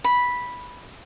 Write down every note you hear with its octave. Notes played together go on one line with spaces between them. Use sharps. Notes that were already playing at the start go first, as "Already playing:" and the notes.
B5